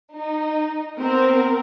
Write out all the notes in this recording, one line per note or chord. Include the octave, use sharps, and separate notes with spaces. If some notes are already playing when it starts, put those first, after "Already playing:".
D#4
B3 C4 A#4